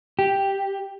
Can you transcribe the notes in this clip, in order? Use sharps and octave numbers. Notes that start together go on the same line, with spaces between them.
G4